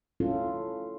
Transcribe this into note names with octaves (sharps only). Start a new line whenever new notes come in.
C#4 E4 F4 A4